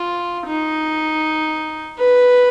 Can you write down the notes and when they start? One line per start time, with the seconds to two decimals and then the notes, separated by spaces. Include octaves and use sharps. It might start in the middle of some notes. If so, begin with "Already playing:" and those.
Already playing: F4
0.46 D#4
1.99 B4